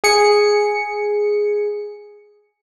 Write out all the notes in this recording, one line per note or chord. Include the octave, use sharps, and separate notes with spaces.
G#4 C#7